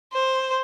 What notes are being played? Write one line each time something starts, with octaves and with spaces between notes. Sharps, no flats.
C5